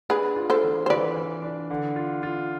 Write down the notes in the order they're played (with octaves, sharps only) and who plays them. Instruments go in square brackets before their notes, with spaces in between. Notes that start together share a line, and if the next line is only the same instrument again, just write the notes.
[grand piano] D4 [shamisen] G#4 B4
[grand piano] F4
[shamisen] A4 C5
[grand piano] E3
[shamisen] C5
[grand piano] E3 [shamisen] B4 D5
[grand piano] E3
D4
D3
F4
F4